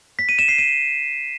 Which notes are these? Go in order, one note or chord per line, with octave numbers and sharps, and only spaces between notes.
B6
D#7
E7
C7
D#7